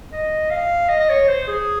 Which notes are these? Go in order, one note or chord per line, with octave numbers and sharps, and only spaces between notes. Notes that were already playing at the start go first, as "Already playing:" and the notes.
D#5
F5
D#5
D#5
C#5
C5
G#4